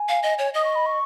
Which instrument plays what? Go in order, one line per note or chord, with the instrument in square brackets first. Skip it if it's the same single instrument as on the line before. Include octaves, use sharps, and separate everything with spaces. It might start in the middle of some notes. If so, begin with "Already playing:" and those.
Already playing: [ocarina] G#5
[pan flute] F5
D#5
C#5
[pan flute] D#5 [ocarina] D#6
[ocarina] C#6
B5
C#6